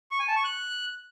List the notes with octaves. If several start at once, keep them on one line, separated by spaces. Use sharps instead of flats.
C#6
G#5
A5
C#6
F#6